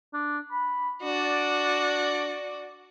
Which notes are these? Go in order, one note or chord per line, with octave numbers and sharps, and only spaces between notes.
D4
B5
D4 F#4 D5